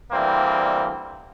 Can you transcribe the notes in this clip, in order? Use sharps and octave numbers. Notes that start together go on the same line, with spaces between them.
D2 E3 G3 A#3 C4